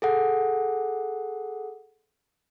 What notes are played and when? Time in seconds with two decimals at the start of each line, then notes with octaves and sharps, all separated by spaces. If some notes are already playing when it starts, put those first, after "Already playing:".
0.02 G#4 A4 F#5